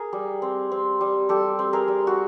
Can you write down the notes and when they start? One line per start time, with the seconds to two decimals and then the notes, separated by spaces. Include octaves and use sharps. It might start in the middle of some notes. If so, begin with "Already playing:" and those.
Already playing: G#4 A#4
0.13 G3
0.42 C4
0.72 C4
1.01 G3
1.29 G3 G4 A4
1.59 C4
1.73 G#4 A#4
1.88 G3
2.07 F#4